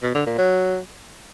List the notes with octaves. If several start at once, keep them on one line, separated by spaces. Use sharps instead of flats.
B2
D3
A#2
F#3